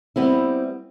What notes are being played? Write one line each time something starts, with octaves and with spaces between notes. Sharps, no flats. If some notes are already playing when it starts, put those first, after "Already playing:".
G3 B3 C4 E4